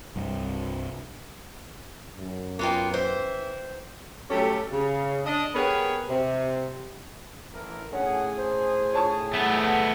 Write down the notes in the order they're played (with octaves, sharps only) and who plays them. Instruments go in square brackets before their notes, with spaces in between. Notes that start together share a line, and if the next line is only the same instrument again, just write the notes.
[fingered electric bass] C2 G2
[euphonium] F#2
[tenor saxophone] A#3 [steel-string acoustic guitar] B3 F4 G5
[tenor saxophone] E3 [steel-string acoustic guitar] C5
[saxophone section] F#3 G3 A3 C#4 G4 A4
C#3
D4 D#5
B3 G4 G#4 A#4 B4 C#5
C3
[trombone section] A1 E3 A#4
[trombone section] A2 G#4 [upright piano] C#4 [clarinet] F#5
[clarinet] C5
[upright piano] C#5 A5 C#6
[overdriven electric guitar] A3 B3 [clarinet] F#5